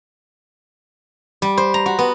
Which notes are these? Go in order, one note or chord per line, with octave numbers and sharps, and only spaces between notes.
G3
C5
A#5
F#4
B3